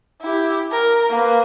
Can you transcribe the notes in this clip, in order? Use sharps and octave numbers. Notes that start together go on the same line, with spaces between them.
E4 G4
A#4
A#3 B4